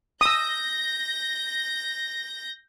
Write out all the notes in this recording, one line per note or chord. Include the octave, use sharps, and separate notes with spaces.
D#6 E6 G6 A#6